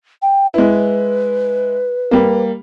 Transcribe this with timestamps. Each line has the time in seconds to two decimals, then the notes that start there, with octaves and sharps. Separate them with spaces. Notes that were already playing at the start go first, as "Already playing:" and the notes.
0.22 G5
0.54 G#3 E4 B4
2.11 G3 A#3